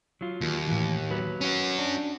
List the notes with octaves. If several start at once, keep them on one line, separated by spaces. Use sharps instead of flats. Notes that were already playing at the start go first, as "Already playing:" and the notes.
F#3 F4
D#2
A2 E3
F#3 B4
C#4 F#4
D4